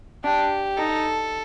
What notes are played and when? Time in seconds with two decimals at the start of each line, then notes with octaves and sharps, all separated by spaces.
0.24 D4 G4
0.77 D#4 A4